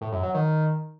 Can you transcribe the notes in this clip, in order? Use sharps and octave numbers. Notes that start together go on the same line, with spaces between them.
A2
F#2
F#3
D#3